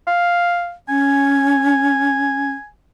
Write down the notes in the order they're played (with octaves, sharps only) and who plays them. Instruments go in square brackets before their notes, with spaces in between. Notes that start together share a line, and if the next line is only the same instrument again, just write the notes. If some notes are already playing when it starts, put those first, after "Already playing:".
[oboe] F5
[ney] C#4 [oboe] G#5